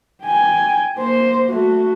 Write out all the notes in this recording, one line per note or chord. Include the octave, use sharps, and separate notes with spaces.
G5 G#5
A#3 C5
A3 F#4